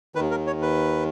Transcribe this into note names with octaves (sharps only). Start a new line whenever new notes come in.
D#2 D#3 B4
A#4
C#5
B4